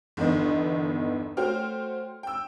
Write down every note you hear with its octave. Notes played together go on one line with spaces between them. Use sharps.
G1 E2 D#3 B3 D#5
A3 F#4 C5 C#5 G5 F6
G5 E6